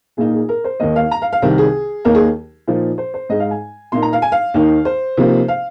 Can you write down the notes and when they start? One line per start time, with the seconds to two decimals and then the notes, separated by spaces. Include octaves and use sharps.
0.17 A#2 A#3 D#4 G#4
0.34 G#4
0.49 A#4
0.64 C5
0.80 D#2 D#3 A#3 D#5
0.96 F5
1.11 A#5
1.22 F5
1.33 F5
1.42 C2 C3 D#3 A#4
1.58 G#4
2.05 D#2 D#3 A#3 D#4 A#4
2.15 G#4
2.67 A#2 F3 A#3 D#4
2.98 C5
3.14 C5
3.29 G#2 G#3 D#4 D#5
3.40 F5
3.51 G#5
3.92 A#2 A#3 D#4 C6
4.02 A#5
4.13 F5
4.22 G#5
4.32 F5
4.54 D#2 D#3 A#3 D#4
4.85 C5
5.17 C3 F3 A#3 D#4
5.48 F5